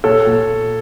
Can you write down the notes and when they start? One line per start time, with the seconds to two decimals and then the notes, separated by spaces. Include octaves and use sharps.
0.04 A#2 A4 C#5
0.27 A#2